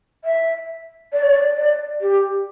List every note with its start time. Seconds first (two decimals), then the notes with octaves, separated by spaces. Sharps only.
0.24 E5
1.12 D5
1.22 C#5
1.32 D5
1.56 D5
2.00 G4